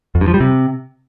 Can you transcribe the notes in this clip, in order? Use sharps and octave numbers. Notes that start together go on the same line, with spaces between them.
F2
G2
F3
G3
C3